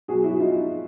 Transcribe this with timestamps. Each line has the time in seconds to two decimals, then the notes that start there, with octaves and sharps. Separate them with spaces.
0.08 B2 F#4 G#4
0.12 F#3
0.24 E4 F#4
0.40 D#4 F4